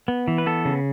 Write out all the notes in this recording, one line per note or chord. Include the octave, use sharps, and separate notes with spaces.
B3
E3
B4
B3 A4
C#3